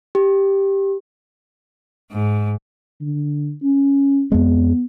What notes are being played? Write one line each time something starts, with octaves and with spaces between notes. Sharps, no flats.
G4
G#2
D3
C#4
F2 G#3 B3